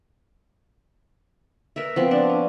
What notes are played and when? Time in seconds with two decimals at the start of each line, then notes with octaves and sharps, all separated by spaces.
1.76 A#4 B4 E5
1.96 F3 B3 C4
2.11 D4
2.29 C#4